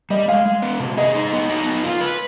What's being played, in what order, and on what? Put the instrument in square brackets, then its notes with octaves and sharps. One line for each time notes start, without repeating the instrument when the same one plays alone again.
[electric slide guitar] G3 [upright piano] D#5
[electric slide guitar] G#3 [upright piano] F5
[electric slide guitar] G#3
B3
C3
[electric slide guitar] G#4 [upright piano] D#5
[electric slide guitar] D#4
B3
D#4
B3
F4
B4